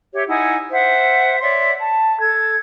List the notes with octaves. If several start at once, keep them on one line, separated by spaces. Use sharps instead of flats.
G4 C#5 E5
D#4 E4 F#5 G#5
C5 E5 F#5
C#5 D5 E5 C6
A5
A4 G#6